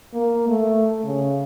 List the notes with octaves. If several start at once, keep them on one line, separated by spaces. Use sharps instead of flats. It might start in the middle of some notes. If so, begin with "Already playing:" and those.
A#3
A3
C#3